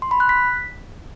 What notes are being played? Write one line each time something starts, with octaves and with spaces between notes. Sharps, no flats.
C6
B5
F#6
B6